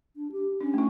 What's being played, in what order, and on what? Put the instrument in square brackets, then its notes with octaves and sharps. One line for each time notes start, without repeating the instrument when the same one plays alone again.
[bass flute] D4
G4
[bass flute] C#4 [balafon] D4
[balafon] A3 E4